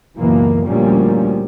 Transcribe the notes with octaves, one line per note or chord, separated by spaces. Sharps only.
C#2 F#2 B2 E3 A#3
D2 A#2 F3 G3 A#3 C#4